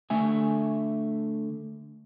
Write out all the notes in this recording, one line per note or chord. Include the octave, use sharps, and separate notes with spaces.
D3 A3 E5 G#5